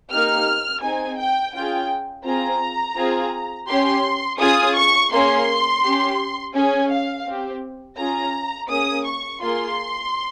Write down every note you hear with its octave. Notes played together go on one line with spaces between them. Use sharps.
A#3 D#4 G4 F6
C4 D#4 G#4 G#5
G5
C#4 F4 G#4 G5
C4 F4 G#4 A#5
C4 F4 G#4
C#4 G4 C6
C#4 F4 G#4 D#6
C#6
A#3 C#4 G#4 C6
C#4 G4
C#4 G#4 G#5
F5
C4 G4
C#4 F4 G#4 A#5
A#3 C#4 G#4 D#6
C#6
A#3 F4 G#4 C6